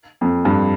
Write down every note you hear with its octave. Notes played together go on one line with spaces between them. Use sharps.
F2
G2